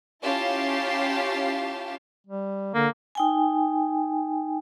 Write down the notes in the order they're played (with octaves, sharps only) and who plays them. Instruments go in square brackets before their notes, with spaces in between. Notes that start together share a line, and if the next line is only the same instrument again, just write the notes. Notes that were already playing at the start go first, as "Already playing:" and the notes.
[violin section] C#4 E4 F4 G4 F5 A5
[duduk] G3
[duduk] D3 [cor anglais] A#3
[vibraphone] D#4 G5 G#5